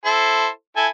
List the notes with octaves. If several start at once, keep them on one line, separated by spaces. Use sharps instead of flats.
E4 A4 C5
E4 A4 G#5